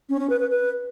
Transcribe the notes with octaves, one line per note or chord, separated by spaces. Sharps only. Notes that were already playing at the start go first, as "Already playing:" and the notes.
C#4
C#4
B4
B4
B4